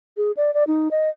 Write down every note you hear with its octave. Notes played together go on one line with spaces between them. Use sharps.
G#4
D5
D5
D#4
D#5